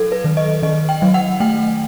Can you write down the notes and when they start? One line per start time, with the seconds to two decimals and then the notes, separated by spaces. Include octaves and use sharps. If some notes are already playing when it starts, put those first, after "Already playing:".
Already playing: F#3 A4
0.12 B4
0.24 D#3
0.37 D#5
0.63 D#3 D#5
0.89 G5
1.02 F#3
1.14 F#5
1.40 A3 G5